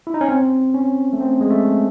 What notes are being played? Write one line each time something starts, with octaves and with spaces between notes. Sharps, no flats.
E4
D#4
C#4
C4
C#4
A3
C4
G#3
A3